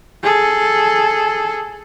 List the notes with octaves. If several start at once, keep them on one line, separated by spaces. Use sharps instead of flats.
G#4 A4